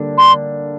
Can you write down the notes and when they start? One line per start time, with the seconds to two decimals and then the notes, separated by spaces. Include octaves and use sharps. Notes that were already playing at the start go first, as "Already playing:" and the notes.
Already playing: D3 G3 A#3 D4
0.18 C6